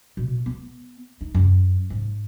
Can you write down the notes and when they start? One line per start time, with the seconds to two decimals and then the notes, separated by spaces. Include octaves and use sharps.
0.17 B2
0.46 B3
1.21 D#4
1.35 F#2
1.90 G#2